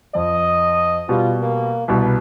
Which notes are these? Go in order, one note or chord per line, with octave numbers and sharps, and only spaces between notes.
F2 D#5
B2 G3 F4
A#3
C2 B2 B4